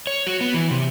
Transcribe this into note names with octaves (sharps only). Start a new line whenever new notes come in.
C#5
F#4
B3
E3
C3